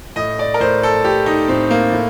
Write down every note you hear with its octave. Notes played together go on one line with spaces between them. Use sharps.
A2 D#5
D5
A#4
A2 C5
A4
A2 G4
D#4
A2 C4
A#3
A2